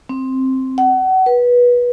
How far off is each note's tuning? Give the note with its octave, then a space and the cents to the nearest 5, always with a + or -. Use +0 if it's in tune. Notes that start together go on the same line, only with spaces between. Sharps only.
C4 +5
F#5 +30
B4 -20